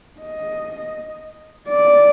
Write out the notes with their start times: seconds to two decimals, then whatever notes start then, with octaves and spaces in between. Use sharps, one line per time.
0.20 D#5
1.69 D5